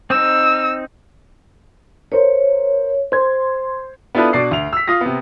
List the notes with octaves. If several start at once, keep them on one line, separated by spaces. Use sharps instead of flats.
C4 D#4 E6
A#4 C5 C#5
C5 C6 G#6
B3 D4 E4 F4 A4 B4
B2 D4 D5 C7
D2 F7
E6 B6
F4 D#6 A#6
C3 B3